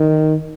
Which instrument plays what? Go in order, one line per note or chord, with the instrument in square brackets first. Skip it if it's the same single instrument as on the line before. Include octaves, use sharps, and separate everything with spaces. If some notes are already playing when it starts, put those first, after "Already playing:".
Already playing: [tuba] D#3